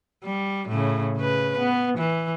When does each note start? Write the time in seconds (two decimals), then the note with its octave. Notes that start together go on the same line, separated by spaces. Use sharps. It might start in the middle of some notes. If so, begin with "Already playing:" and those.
0.24 G3
0.68 A2 C#3
1.16 C#3 B4
1.58 B3
1.98 E3